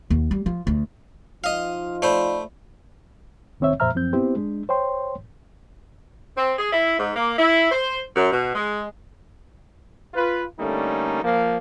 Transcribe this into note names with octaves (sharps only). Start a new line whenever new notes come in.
D#2
G3
F3
D2
F3 D#4 F4 D#5 F5
A3 C5 D5 B5
C2 D#3 C4 C#5 E5
F2 A#2 C5 E5 A#5 F6
F#2 F3 C4 G6
B3 C4 E4 G4 C5
G#3 D4
C5 C#5 G5 C6
C4
G#4
E4
G#2
A#3
E4
C5
F#2
B2
G#3
F4 B4
D3 G3 A3 A#3 C#4 D#4
F3 A#3